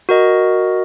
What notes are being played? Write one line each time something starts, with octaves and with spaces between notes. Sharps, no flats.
F#4 A#4 D#5